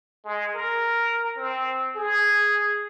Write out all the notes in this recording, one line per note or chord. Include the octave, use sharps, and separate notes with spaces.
G#3
A#4
C4
G#4